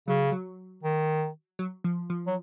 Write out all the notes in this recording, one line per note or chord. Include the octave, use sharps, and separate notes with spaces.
C#3 F#3
F#3
D#3
F#3
F3
F3
F#3